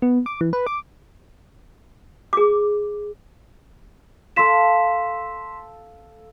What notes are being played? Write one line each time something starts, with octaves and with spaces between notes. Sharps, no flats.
B3
D6
E3
B4
D6
G#4 D6
A4 F5 C6 B6 E7